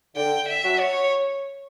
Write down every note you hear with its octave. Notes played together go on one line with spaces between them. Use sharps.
D3 G5
E5
F#3 C#4 F#4
C#5